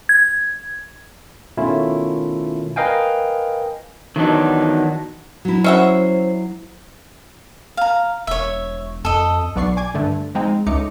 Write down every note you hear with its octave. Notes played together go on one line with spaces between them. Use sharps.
G#6
B2 D#3 A3 C#4 E4 F4
A#4 B4 D#5 F5 G5 G#5
D#3 E3 F#3 B3 D4 D#4
F#3 E4
C#4 C5 E5 F#5
F5 A#5
E1 C#5 E5
F2 A4 D#5
B1 B3 D5 C#6 C7
G#5 D6 G#6
G2 D3 A3
F3 G#3 C4 D#4
C#2 A3 D#4 D6 C#7